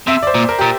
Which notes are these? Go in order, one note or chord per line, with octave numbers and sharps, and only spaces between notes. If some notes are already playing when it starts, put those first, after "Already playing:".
C3 E5
D5
C5
A#2
A#4
A#2 G4